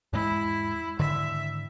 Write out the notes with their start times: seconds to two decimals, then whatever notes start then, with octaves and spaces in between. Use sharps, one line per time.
0.13 E2 G#2 G#3 E4
0.99 G#2 D3 D#3 E5